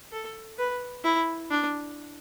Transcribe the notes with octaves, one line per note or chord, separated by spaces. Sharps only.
A4
B4
E4
D4